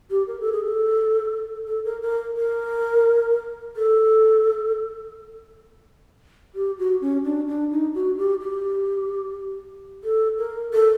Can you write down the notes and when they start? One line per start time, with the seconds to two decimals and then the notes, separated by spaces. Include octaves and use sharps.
0.11 G4
0.28 A#4
0.40 A4
0.52 G#4
0.65 A4
1.67 A4
1.85 A#4
2.02 A#4
2.37 A#4
3.76 A4
6.55 G4
6.79 F#4
7.01 C#4
7.24 D4
7.48 D4
7.71 D#4
7.95 F#4
8.18 G4
8.41 G4
10.04 A4
10.38 A#4
10.73 A4